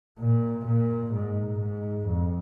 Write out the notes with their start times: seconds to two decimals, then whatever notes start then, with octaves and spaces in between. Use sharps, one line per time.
0.20 A#2
0.66 A#2
1.14 G#2
1.60 G#2
2.08 F2